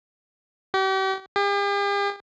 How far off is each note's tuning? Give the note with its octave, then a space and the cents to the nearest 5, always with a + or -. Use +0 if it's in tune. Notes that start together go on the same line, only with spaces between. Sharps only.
G4 -40
G4 +45